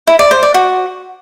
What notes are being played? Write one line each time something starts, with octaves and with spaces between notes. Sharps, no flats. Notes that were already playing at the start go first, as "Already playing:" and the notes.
E4
D5
C5
D5
F#4